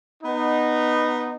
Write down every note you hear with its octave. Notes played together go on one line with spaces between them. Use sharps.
B3 D#4